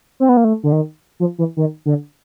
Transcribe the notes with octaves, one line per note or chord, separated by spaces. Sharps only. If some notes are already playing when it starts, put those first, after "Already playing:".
C4
B3
A#3
A3
D3
D#3
F3
E3
D#3
D3